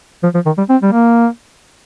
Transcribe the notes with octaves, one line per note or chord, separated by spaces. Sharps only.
F3
F3
D#3
G3
C4
G3
A#3